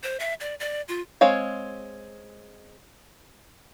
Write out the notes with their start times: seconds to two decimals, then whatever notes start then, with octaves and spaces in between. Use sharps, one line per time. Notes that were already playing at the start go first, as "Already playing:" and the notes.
0.03 C5
0.20 E5
0.40 D5
0.60 D5
0.88 F4
1.21 G#3 C4 C#5 F5